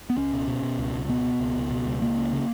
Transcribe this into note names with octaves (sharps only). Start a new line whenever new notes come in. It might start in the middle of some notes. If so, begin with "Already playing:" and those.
B3
C#2 C#4
B2
B2
B2
C#2
C#2
B2 B3
B2
C#2
C#2
B2
C#2
C#2 A#3
C#3
C#3